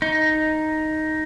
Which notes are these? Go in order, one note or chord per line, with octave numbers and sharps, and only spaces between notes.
D#4